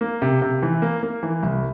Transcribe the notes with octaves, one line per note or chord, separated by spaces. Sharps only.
A#3
C3
C3
E3
A#3
A#3
E3
C2